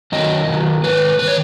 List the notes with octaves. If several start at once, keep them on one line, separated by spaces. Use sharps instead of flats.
F#2 D#3 F#3 D#5
F#2 D#3 F#3
G#2 D#3 B4
D#3 B4
C#5